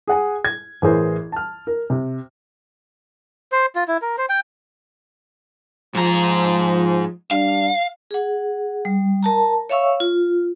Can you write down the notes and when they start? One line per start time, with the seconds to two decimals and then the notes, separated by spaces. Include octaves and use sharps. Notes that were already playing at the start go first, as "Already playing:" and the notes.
0.07 G#4 F#5 G#5
0.45 G#6
0.82 A1 E3 G#4 A#4 C5
1.32 A5 F6
1.67 A#4
1.90 C3
3.52 C5
3.75 F4
3.88 E4
4.02 A#4
4.18 C5
4.29 G5
5.95 G#2 F3 A#5
7.31 G3 D4 F5
8.11 G#4 F#5
8.85 G3
9.23 A#4 A5 A#5
9.70 C#5 E5 F5 C#6 E6
10.00 F4